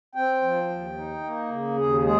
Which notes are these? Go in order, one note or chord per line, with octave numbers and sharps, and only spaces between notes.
C4 G5
F3
D#2
D#4
A#3
C#3
D#2 G#4
G#3 G#4